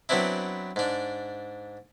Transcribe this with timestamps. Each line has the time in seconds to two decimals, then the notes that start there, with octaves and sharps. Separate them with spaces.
0.09 F#3 B3 C4 D4 E4
0.76 G#2 D4